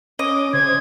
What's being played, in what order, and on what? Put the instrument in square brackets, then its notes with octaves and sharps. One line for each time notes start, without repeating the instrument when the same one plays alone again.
[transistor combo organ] C#4 D6 [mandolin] D#5
[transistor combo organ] C#3 C5 [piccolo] G#6